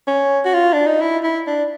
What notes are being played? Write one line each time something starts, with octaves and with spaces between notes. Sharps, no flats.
C#4
F#4
F4
D4
D#4
E4
E4
D4